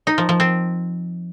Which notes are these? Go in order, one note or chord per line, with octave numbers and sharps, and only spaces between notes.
D#4
F3
F3
C4